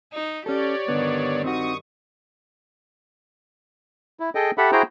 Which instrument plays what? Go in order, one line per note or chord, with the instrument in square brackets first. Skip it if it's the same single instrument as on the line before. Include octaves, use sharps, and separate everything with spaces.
[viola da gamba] D#4
[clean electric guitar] C#4 A4 [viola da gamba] G4 [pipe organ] C#5 D5
[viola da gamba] G2 D#3 [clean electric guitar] D3 B3
[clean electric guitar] C4 D#4 F#4 [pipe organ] C#6 D#6
[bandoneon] E4
G#4 A4 D#5 G5
G4 A4 E5 F#5 B5
E4 F#4 G#4 C5 G5 A#5